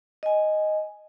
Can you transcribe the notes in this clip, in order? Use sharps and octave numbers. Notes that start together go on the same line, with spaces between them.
D#5 G#5